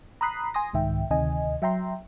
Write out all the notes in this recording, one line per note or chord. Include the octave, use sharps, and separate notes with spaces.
A#5 B5 D#6 F#6 B6 C7
G#5 C6 D#6 A#6
C2 G#2 D#3 E5 G5
D2 C3 D#3 D#5 G#5
F#3 E5 G5 A#5 C6